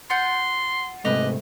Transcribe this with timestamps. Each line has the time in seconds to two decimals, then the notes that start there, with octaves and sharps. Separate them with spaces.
0.10 F4 F#5 C6 G6
1.05 G#2 C3 A3 G4 B4 D#5